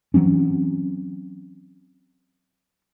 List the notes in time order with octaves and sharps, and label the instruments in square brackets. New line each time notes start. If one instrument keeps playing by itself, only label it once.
[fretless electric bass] E3 F#3 C4 C#4